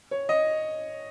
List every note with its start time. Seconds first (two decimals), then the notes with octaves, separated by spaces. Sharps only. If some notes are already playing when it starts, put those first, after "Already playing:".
0.11 C#5
0.29 D#5